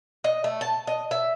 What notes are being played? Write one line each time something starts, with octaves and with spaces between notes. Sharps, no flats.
D#5
A3
A5
D#5
E5